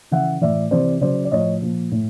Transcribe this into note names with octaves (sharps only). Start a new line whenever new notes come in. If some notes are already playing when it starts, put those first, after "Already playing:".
C#3 E3 E5 F#5
A2 E3 D5 E5
C3 E3 C5 D5
C#3 F#3 C5 D5
D5
A2 F3 C#5 D#5
A#2 F3
A2